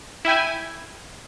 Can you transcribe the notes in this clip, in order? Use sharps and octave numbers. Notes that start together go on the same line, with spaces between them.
E4 E5 G5 G#5